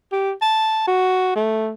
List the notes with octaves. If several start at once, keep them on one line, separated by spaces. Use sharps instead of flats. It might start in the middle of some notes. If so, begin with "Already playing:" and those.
G4
A5
F#4
A3